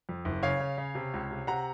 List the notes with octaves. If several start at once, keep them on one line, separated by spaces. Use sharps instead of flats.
F2
F#1
C#3 C#5 F5
C#3
C#3
C3
C#2
C3
C3 F#5 A#5